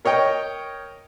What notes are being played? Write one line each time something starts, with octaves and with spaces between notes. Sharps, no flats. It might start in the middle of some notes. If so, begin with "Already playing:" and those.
A#4 C#5 D#5 G5